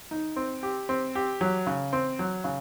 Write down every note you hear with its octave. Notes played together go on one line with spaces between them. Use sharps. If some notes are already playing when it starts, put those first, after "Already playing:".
D#4
C4
G4
C4
G4
F#3
C#3
C4
F#3
C#3